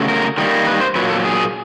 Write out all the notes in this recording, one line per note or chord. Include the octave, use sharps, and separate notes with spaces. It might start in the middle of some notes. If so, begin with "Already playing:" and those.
Already playing: C#3 F#3 A3
A#4
D#3 G3 A#3
B4
C5
A#2 F#3 A#3 B4
A4
G#4